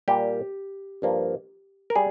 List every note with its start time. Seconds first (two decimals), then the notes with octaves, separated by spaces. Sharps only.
0.08 A#2 G3 A#3 G4
1.02 G2 F3 A#3
1.90 A#4
1.96 G3 G#4